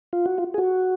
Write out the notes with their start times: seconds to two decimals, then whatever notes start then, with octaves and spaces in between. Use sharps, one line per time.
0.13 F4
0.26 F#4
0.38 F4
0.54 G#4
0.58 F#4